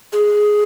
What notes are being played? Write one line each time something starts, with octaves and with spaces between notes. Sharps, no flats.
G#4